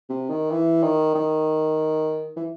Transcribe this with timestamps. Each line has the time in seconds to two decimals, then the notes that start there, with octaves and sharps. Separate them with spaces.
0.09 C3
0.29 D#3
0.51 E3
0.83 D#3
1.15 D#3
2.37 E3